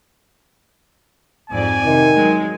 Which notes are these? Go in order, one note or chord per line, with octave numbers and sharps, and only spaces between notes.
F2 G#2 D5 G#5
C3 D#3
F#3 G#3